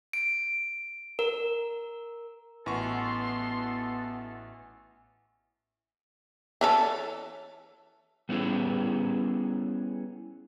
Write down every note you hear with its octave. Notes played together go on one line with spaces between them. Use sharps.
D7
A#4
A1 E3 B3 F#4 A4 C6 C#6
E3 C#4 A4
G3 B3 C#4 E4 G#4